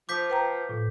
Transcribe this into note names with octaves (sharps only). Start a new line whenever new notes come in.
F3 D6 G6 B6
B4 G5 A#5
A2